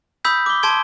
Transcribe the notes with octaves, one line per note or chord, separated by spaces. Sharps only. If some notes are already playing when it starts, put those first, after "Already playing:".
B5 D#6 E6 G6 B6
D6 G7
A5 C6 G#6 D7 G7